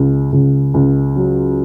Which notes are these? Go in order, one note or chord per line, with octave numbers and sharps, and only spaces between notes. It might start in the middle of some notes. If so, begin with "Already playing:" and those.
Already playing: C#2
C#2
C#2
F#3